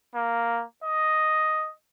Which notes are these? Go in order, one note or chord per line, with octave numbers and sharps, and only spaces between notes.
A#3
D#5